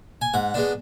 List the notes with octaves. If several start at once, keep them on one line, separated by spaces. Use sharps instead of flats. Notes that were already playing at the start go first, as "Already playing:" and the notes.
G#5
G#2 F#5
G#3 B3 D4